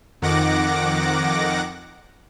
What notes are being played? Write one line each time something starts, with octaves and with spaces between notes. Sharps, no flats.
F2 D#3 F#5 D6 A#6